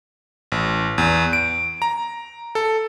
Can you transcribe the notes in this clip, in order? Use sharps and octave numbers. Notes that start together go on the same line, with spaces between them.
A1
E2
D7
A#5
A4